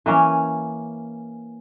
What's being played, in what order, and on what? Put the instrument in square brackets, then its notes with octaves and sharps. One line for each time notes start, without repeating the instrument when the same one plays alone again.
[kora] E3 A#3 C#4